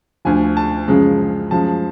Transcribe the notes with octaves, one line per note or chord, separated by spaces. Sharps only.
D2 D3 F3 G#5
A5
F#2 C#3 F3 G#3
F#2 F3 G#3 A5